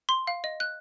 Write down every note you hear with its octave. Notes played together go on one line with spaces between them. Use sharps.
C6
F5
D#5
F#6